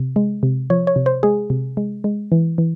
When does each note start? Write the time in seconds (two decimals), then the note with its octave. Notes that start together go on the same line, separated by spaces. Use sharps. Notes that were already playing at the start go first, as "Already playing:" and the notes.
Already playing: C3
0.16 G#3
0.43 C3
0.70 F3 C#5
0.87 C#5
0.96 C3
1.06 C5
1.23 G#3 G#4
1.50 C3
1.77 G#3
2.04 G#3
2.32 E3
2.58 E3